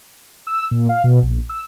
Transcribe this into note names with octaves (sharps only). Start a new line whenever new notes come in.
E6
A#2
F5
B2
A#1
E6